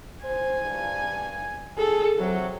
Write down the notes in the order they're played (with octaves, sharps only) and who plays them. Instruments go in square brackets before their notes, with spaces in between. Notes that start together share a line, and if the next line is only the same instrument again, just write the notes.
[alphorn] C5 [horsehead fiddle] G#5
[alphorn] G2
[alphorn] G#4 [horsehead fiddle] A4
[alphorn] C3 [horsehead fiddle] F#3